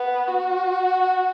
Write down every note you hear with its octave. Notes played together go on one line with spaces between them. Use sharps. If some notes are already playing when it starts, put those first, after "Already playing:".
Already playing: B3
F#4